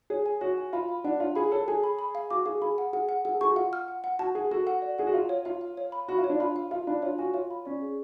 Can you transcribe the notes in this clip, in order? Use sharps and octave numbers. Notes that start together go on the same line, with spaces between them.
G#4 C#5
G#5
F#4 C#5
G#5
F4 B5
B5
D4 F#5
F4 C#5
G#4 B5
A4 C#5
G#4 G#5
B5
B5
F5
F#4 D6
G#4 F5
G#4 B5
F#5
G#4 F#5
F#5
G#4 F#5
A4
G#4 C#6
F#4
F4 F#5
F6
F#5
F#5
F#4 A5
G#4 F#5
F#4 A4
F#5
D5
G#4 F#5
F#4
F4 F5
C#5
F4 F5
F5
C#5
B5
F#4 B5
F4
C#5
D4
F4 B5
F5
F4 F5
D4 B5
F4 C#5
F#4 G#5
F4 C#5
B5
C#4 D5
G#4